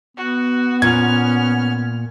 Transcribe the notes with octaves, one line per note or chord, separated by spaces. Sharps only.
B3 F#4
A#2 C#4 F6 G#6